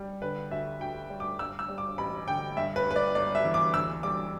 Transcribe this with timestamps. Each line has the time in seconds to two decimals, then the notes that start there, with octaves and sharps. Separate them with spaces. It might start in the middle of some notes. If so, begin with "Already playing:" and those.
Already playing: G3
0.22 D3 B4
0.51 D2 E5
0.81 D2 G5
1.10 G3
1.20 D6
1.39 G2 E6
1.59 E6
1.68 G3
1.78 D6
1.98 A1 B5
2.27 D3 G5
2.57 G2 E5
2.76 B4
2.86 G1 B4
2.96 D5
3.15 G1 D5
3.35 E5
3.44 E3
3.54 D6
3.74 D2 E6
4.03 G3 D6